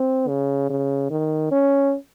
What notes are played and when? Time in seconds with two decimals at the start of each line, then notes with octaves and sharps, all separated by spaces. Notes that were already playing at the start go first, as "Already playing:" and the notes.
Already playing: C4
0.28 C#3
0.70 C#3
1.11 D#3
1.51 C#4